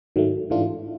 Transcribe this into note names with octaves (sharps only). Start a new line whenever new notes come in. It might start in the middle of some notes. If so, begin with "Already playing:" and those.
G#2 D#3 F#3 A3
G#2 E3 A3 D4 F4